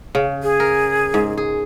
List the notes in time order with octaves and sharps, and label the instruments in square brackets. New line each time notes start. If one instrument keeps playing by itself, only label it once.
[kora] C#3
[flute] G#4
[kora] A#4
G#2
G#4